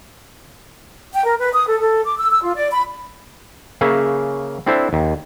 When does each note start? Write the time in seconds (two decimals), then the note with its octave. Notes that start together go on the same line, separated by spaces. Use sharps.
1.12 G5
1.24 A#4
1.39 B4
1.53 D#6
1.67 A4
1.79 A4
2.05 D6
2.18 E6
2.31 E6
2.43 F4
2.55 D5
2.71 B5
3.81 C#3 A#3 G#4 C#5 E5
4.66 C4 D4 E4 A4 C5
4.93 D#2